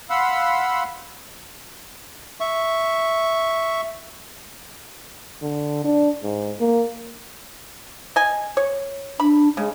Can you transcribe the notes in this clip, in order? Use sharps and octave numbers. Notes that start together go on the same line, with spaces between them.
F5 F#5 B5 C6 E6
E5 C#6
D3
D4
G#2
A#3
D#5 G#5
C#5
D4 B5
C#3 G#3